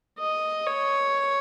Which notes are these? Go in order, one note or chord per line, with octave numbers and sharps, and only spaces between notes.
D#5
C#5